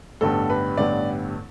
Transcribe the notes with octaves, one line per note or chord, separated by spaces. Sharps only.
A1 G2 D3 G3 B3 A4
B4
A1 G2 D3 G3 B3 D5